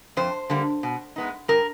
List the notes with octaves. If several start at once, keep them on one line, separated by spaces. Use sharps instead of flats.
F2 C5
D3 G3 A#3
B2
G#3 B3 D#4
G2 A#4